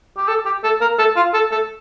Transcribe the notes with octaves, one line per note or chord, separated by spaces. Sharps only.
G4
A4
G4
A4
A#4
A4
F4
A4
A4